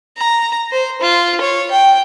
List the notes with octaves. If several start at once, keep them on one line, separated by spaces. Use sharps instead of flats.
A#5
C5
F4
C#5
G5